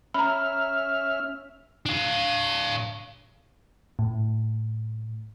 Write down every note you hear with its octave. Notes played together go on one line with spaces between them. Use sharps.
C#4 E5 A#5 B5 F6
D4 F5
A2